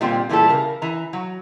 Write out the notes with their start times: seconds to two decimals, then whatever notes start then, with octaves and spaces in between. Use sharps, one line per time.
0.01 A#2 D3 G3 C4 G5
0.29 A#2 E3 G3 A3 A4
0.49 C#3 A#4
0.82 E3 A#5
1.13 F#3